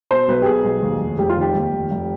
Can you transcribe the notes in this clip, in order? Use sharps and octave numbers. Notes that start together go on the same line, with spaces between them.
B2 C5
B1 B4
G4
B2 G#4
B1
D#2
F1
F1 G4
F4
D#3 G4
D#2
F1
F1